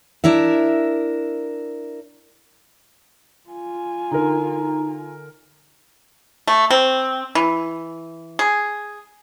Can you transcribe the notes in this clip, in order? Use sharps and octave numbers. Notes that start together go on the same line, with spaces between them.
D4 E4 A#4 E5
F4 G#5
D3 D#4 A#4 A#5
A3
C4
E3
G#4